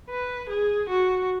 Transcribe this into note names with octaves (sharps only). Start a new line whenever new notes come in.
B4
G#4
F#4